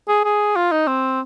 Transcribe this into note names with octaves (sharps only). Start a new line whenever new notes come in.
G#4
G#4
F4
D#4
C4